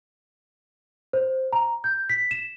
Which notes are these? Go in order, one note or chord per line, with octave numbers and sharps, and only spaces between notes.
C5
A#5
G6
B6
E7